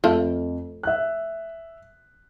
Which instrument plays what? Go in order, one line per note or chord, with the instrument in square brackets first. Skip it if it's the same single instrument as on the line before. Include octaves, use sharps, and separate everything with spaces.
[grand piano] F2 [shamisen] F3 A3
[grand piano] E5 F#6